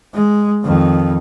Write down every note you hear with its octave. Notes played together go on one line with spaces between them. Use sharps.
G#3
F2 D#3